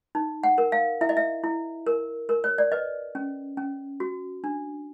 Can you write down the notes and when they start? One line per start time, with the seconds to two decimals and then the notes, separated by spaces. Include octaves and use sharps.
0.15 D#4
0.44 F#5
0.58 A#4
0.72 F5
1.01 E4 E5
1.09 D#5
1.17 E5
1.44 E4
1.87 A#4
2.29 A#4
2.44 C#5
2.58 D5
2.72 B4 D#5
3.15 C#4
3.57 C#4
4.00 F#4
4.44 D4